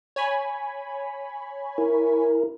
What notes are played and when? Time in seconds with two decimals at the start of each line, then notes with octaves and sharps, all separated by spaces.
0.16 C#5 G#5 B5
1.78 E4 A#4